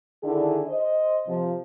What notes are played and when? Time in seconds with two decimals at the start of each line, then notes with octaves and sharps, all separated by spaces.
0.23 D3 D#3 D4 E4 G#4
0.68 C5 D#5
1.28 C3 F3